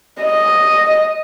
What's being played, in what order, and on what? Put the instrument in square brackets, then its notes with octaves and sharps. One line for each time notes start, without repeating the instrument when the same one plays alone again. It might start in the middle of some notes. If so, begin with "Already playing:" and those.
[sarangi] D#5